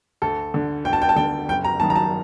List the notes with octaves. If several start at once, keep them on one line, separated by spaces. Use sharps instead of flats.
D2 A4
D3
D2 G5
A5
G5
A5
D3 G5
F#1 G5
A#5
F#2 D#3 A5
A#5
A5